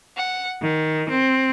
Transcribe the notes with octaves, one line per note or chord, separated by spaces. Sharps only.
F#5
D#3
C4